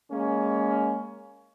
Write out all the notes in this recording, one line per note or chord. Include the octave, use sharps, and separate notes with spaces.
G#3 A#3 C#4